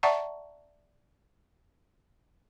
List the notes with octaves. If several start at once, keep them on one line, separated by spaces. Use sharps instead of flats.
D5 E5 F#5 A5 A#5 C#6